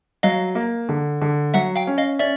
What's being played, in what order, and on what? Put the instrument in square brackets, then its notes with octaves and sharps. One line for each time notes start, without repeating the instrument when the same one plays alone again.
[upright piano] F#3 [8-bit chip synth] D#5 F5
[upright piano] A#3
D3
D3
[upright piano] F#3 [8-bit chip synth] E5 F#5
[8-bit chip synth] F5 G5
[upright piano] C#4
[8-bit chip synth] D#5 F5
[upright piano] C#4 [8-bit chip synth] D5 E5